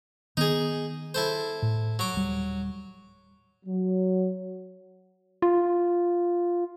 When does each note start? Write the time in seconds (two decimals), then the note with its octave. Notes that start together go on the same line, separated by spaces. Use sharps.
0.37 D#3 B3 D#4 G#4
1.14 E4 A4 C5
1.62 A2
1.99 F#3 D6
2.14 D#1 G3
3.66 F#3
5.42 F4